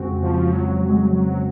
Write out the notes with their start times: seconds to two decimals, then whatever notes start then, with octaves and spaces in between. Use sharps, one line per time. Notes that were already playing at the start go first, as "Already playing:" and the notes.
Already playing: F2 C#3 G#3 C4 F#4
0.23 F3
0.53 F#3
0.82 F#3
0.89 G#3
0.97 F#3
1.13 F#3